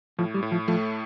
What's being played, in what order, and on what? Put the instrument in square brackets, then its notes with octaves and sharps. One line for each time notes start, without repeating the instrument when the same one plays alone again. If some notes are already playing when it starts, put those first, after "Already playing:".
[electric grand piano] A2 [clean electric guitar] F3
[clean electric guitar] G3
[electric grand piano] A2
[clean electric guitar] F3
[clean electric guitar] F3 [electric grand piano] A3